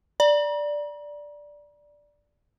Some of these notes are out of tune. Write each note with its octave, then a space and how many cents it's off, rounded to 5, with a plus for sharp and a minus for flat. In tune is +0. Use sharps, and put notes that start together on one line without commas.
D5 +0 A#5 +40